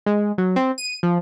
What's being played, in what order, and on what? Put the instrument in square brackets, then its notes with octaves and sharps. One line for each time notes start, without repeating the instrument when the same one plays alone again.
[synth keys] G#3
F#3
C4
D#7
F3